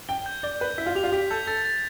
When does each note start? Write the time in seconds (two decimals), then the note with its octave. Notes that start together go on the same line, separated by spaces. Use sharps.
0.09 G5 G7
0.26 G6
0.43 D5 G7
0.60 B4 G6
0.78 E4 B6
0.86 F4
0.95 G4 F7
1.04 F4
1.12 G4 B6
1.30 A4 G6
1.47 A4 A6
1.65 A6